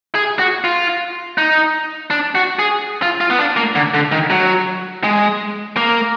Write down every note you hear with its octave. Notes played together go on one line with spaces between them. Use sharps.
G#4
F#4
F4
D#4
D4
F#4
G#4
F4
F4
B3
D4
A#3
D3
D3
D#3
F#3
G#3
A#3